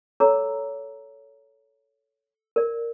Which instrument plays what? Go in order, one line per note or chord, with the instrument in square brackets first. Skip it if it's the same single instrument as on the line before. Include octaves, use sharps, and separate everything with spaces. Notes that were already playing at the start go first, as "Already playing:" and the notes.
[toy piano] A4 C#5 A#5 D6 E6
A#4 D5